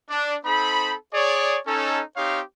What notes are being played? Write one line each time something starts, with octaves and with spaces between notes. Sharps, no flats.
D4
C4 D#4 A4 C5 B5
G#4 C#5 D5
C#4 D#4 A4
C4 D#4 G4 C5 C#5 F5